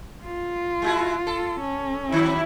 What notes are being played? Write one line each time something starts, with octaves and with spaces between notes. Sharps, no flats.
F4
G#3 E4 F#4
A4
C#4
D#3 F#3 E4